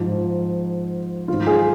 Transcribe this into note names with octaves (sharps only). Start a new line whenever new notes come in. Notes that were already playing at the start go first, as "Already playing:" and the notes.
Already playing: G#2 F3
G#2 D#3 F#3 F4
G#4